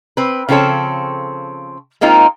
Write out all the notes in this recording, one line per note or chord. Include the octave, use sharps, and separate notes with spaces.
C4 B4
C#3 F3 C4 A4 C#5
G#3 A#3 C4 D#4 F4